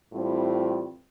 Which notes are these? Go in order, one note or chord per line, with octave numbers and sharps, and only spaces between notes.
A2 E3 G3 C4 F4